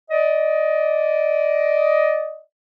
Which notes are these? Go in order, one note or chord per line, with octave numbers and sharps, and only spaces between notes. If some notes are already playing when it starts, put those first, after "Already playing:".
D5 D#5